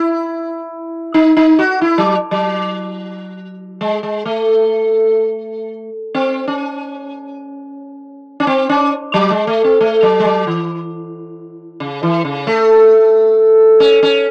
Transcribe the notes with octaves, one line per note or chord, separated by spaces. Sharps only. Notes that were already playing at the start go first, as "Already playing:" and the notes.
Already playing: E4
D#4
D#4
F#4
E4
F#3
F#3
G#3
G#3
A3
C4
C#4
C#4
C4
C#4
F#3
G#3
A3
C4
A3
F#3
G#3
F#3
E3
C#3
E3
C#3
A3
C#4
C#4